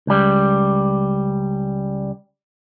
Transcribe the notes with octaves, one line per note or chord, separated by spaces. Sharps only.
C#2 G3